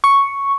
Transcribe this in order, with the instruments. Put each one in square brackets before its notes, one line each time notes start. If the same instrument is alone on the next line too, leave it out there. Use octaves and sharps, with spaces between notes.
[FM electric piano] C#6